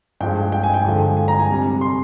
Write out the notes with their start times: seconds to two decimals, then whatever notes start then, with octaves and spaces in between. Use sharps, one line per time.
0.20 G2 F3 G#3 G5
0.52 G5
0.63 G#5
0.74 G5
0.85 G2 D3 F3 G#3
1.17 G#5
1.28 A#5
1.40 G#5
1.49 C3 G3
1.81 C6